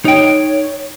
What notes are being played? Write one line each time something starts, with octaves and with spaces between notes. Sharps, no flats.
D#4 C#5 G5